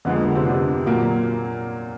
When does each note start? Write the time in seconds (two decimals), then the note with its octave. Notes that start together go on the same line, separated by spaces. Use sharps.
0.05 F2 D3 F3 G#3 B3
0.15 A#3
0.25 B3
0.35 C3 C4
0.46 D3 D4
0.86 A#2 F#3 A#3